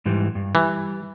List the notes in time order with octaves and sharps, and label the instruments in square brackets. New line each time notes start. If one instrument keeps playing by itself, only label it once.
[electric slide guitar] G#2 E3 G3
G2
[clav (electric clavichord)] E3 [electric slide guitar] G3